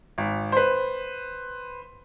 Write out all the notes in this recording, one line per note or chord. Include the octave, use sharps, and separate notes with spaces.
G#1
B4 C5